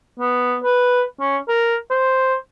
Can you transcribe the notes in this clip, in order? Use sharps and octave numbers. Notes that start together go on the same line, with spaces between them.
B3
B4
C#4
A#4
C5